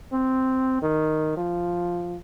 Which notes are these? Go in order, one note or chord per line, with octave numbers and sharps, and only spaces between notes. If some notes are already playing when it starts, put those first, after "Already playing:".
C4
D#3
F3